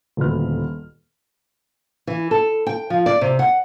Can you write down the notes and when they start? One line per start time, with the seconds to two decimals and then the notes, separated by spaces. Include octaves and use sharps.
0.17 D#1 D2 B4 F6
2.07 E3
2.31 A4
2.67 G5
2.90 F3
3.06 D5
3.21 C3
3.39 F#5